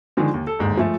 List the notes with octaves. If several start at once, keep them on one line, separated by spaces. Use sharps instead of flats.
D3 D#3 F3 G#3
D#2
A4
G1 D#2 G#2
F3 G#3 A3